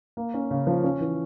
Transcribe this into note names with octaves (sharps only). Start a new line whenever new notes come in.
A#3
C#4
C#3
F3
C#4
E3